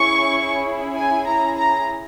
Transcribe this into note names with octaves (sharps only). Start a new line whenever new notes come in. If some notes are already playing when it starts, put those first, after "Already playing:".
Already playing: C#4 E4 G#4 C#6
G#5
A#5
A#5